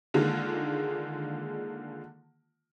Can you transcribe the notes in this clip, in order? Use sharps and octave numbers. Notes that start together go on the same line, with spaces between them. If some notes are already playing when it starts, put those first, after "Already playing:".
D3 D#3 G#3 A#3 F4